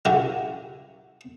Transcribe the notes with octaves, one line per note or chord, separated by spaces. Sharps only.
C#3 F#3 C#4 E4 G4 A#4